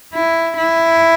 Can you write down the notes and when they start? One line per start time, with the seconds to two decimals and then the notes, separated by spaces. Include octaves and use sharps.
0.14 E4
0.58 E4